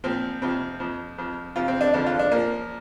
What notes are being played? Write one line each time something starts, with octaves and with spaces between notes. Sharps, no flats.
A#2 F3 C4
F2 C3 F3 C4
F2 F3
F2 F3
F2 C3 F3 F4
C4
D4
F2 D3 F3 D4
F4
D4
A#2 F3 A#3